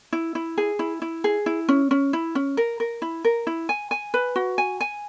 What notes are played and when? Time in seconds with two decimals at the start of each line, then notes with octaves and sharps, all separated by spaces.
0.13 E4
0.35 E4
0.58 G#4
0.79 E4
1.02 E4
1.24 G#4
1.46 E4
1.69 C#4
1.91 C#4
2.13 E4
2.35 C#4
2.57 A#4
2.80 A#4
3.02 E4
3.25 A#4
3.47 E4
3.69 G#5
3.91 G#5
4.14 B4
4.36 F#4
4.58 G#5
4.81 G#5